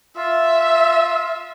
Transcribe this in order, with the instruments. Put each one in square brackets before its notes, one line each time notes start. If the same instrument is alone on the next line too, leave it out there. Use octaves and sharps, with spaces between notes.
[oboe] F4 [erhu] E5